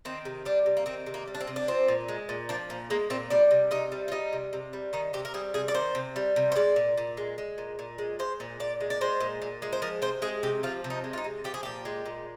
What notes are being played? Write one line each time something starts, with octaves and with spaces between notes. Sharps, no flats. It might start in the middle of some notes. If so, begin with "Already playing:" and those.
D#3 C4
C3
G3 D4
C3
A#3
D#3 C4
C3
A#3
G3
D4
C4
C3
D4
F3 C4
A#2
G#3
A#2
F3 D4
A#2
G#3 A#3
A#2 C4
G3 D4
C3
C3 D#4
G3
F4
G3 D#4
C3
C3
G3
D#3 D#4
C3 G4
A#4
G3 G#4
C3 G#4
D5
D#3 C5
C3
G3
C3
C5
G#3 D5
A#2
A#2
G#3
G#3
A#2
A#2
G#3
G#3 C5
A#2
A#2 D5
G#3
D5
G#3 C5
A#2
A#2
G#3
C5
F3 A#4
C3 C5
G#3 G#4
C3 G4
F3 F4
C3
D#4
G#3
F4
D#4
C3
F3 G4
G#4
A#2 G4
G#3
A#2